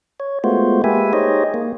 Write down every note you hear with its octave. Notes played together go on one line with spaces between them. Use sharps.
C#5
G#3 A3 B3 F4 F#4 C5
G#3 A#3 G4 B4 E5 G#5
D#4 G4 G#4 C5 C#5 D#5
A#3